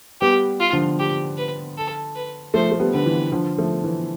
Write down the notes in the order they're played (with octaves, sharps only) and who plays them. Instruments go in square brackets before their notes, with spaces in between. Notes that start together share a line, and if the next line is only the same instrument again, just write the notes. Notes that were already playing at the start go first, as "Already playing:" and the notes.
[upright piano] G3 B3 [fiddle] G4
[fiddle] F4
[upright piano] D3 F3
[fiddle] G4
B4
A4
B4
[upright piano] F3 A3 [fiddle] C5
[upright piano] A3
G3 B3
[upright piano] D3 [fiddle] B4
[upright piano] E3
D3 F3
F3 A3
E3